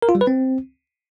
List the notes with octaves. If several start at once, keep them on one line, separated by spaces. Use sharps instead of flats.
A#4
F4
G3
B4
C4